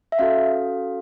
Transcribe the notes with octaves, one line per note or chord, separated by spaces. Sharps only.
E5
C#4 F#4 A4 F5